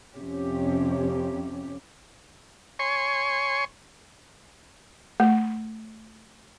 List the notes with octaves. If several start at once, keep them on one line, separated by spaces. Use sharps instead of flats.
F2 C3 C#4 G4
C#5 G#5 C6 C#6
A3